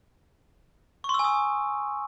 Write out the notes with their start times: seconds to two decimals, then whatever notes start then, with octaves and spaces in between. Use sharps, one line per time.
1.04 C#6
1.09 C6
1.14 E6
1.19 G#5
1.24 D#6